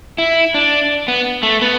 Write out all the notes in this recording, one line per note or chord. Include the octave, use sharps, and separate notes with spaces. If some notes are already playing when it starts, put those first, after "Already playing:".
E4
D4
B3
A3
B3